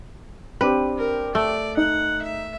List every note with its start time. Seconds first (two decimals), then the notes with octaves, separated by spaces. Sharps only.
0.61 C4 D4 G4 B4
0.97 A#4
1.35 A3 D5
1.77 D#4 F#5
2.22 E5